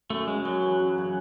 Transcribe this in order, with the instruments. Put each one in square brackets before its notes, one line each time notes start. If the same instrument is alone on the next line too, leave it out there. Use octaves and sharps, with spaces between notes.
[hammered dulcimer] F#2 [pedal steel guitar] A3
[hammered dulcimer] C#3 [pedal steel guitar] G#3
[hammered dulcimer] F#2 [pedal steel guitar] F#3
[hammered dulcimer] E3
F#2
C#3